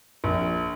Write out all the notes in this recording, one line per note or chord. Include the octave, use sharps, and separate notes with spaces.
A#1